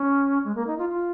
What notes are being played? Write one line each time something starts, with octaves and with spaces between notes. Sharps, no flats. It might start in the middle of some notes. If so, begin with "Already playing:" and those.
Already playing: C#4
G#3
A#3
D#4
F4
F4